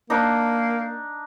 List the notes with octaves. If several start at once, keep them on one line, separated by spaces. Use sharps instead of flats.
A#3 D4 D#4